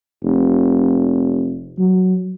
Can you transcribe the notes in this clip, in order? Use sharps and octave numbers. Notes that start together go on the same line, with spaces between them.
F1
F#3